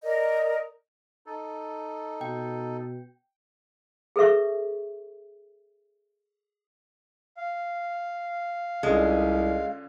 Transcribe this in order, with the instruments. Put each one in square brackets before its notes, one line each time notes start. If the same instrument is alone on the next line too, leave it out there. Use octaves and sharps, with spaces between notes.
[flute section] A#4 D5 D#5
[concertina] D#4 A4
[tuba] B2 [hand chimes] G5
[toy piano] G#4 A4 B4 E5 C#6
[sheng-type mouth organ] F5
[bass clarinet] C2 [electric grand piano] D3 C#4 F4 [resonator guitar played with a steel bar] G#3